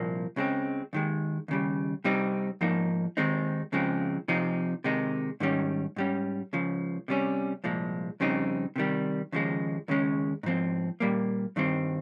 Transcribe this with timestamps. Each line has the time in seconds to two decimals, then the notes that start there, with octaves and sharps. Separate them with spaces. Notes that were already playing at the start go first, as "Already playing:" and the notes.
Already playing: C2 A#2 F3 A#3
0.36 C#2 C#3 G#3 C4
0.93 D#2 D#3 G#3
1.48 D#2 C#3 G3
2.04 C3 G3 C4 D#4
2.61 G#2 F3 A#3 D#4
3.17 D#2 D#3 G#3 C4 D#4
3.72 C#2 C#3 F3 G#3 C4
4.28 C3 F3 C4 D#4
4.84 C3 D#3 G#3 D#4
5.40 G#2 D#3 G3 C#4
5.96 G#2 G3 C#4
6.53 C#2 C#3 F3
7.08 C3 G3 C#4
7.64 C2 A#2 F3 G#3
8.20 F2 C#3 G3 C4 D#4
8.76 C3 D#3 G3
9.32 D#2 C#3 F3 G#3
9.88 D#2 C#3 G#3 C#4
10.43 G#2 F3 C4
11.00 A#2 G3 A#3
11.56 G2 D#3 G3 C4